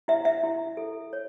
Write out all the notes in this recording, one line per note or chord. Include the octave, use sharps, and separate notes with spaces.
E4 E5
E5
E4
A4
C#5